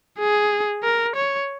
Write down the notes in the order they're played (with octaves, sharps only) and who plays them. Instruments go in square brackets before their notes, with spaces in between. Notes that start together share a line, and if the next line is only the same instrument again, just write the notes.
[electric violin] G#4
A#4
C#5